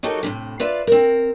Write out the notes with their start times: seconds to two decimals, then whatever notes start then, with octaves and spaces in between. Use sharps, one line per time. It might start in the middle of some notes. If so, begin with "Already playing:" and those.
0.03 F#3 D#4 F#4 G4 A4 A#4
0.23 A2 C3 D#3
0.60 F4 B4 D5 E5
0.87 C4 A#4